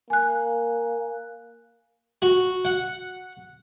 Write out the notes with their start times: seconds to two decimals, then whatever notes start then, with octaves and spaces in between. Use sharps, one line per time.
0.10 A#3 G#5 F#6
2.22 F#4
2.65 F#5